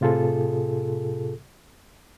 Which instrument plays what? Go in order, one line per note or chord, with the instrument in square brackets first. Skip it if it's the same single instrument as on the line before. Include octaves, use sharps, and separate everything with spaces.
[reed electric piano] A2 C3 F4 G#4 A4